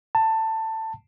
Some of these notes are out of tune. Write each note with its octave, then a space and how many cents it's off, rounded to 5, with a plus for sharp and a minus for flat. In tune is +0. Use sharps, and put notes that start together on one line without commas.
A5 +15